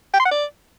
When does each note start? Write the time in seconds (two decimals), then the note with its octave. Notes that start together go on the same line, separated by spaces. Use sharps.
0.14 G5
0.20 C6
0.25 F#5
0.31 D5